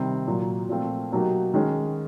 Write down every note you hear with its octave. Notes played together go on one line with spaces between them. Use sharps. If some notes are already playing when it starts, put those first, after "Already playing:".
Already playing: C3 D#3 G3 C4
A#2 F#3 A#3
A#2 F3 A3 C4 F4
B2 F#3 A#3 D#4 G4
D#3 G#3 C#4